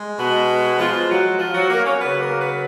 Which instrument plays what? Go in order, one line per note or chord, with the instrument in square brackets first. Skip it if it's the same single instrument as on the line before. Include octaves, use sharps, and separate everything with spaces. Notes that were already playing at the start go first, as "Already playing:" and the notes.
Already playing: [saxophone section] G#3
B2 B3
F3 F4
F#3 F#4
F3 F4
F#3 F#4
A#3 A#4
C#4 C#5
C#3 F#3 B3 B4
A#3 A#4
B3 B4